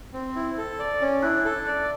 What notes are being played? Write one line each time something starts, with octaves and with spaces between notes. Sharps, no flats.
C4
E4
A4
D5
C#4
D4 E4
A4
D5